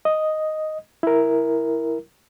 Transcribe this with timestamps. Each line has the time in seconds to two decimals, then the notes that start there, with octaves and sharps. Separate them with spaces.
0.05 D#5
1.03 E4 A#4